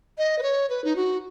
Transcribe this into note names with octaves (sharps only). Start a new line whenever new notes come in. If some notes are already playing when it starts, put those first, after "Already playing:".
D#5
B4
C#5
B4
D#4
F#4